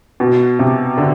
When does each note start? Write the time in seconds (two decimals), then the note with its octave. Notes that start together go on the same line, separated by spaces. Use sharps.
0.20 B2
0.59 C3
0.97 D3